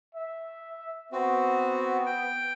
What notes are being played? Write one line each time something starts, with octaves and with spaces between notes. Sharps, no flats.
E5
B3 C4 F#4
G5